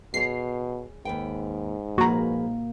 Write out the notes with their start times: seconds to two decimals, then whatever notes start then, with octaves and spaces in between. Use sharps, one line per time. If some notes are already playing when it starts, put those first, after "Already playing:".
0.14 B2 G#4 C#5 C7
1.05 D#2 G#2 B4 G5
1.98 F3 A#3 F#4 G#4 B4 A#5